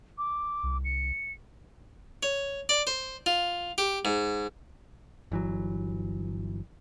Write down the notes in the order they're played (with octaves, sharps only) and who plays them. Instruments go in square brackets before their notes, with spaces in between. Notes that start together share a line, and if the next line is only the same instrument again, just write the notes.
[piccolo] D6
[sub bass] C2
[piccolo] C#7
[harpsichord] C#5
D5
C5
F4
G4
G#2
[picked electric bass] G1 E3 F#3